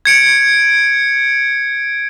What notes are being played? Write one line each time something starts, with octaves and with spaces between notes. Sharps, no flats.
G#6 C#7 D7